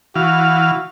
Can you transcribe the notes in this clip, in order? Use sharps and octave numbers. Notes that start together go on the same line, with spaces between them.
E3 F#4 F5